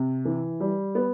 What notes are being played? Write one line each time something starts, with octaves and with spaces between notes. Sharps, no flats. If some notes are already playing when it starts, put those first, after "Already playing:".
Already playing: C3
E3
G3
B3